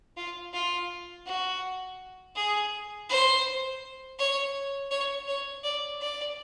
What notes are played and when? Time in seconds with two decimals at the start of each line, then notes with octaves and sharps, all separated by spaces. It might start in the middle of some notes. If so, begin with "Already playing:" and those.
0.17 F4
0.53 F4
1.26 F#4
2.35 G#4
3.09 C5
4.19 C#5
4.91 C#5
5.28 C#5
5.64 D5
6.00 D5